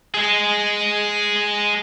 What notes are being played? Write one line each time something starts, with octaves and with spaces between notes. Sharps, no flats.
G#4 D#5